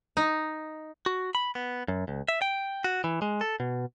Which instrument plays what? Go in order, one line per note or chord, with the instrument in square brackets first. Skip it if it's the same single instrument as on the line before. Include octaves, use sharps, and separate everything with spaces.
[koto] D#4
[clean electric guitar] F#4
B5
B3
F#2
C#2
E5
G5
F#4
E3
G#3
A4
B2